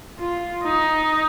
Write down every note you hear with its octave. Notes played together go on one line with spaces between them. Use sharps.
F4
D#4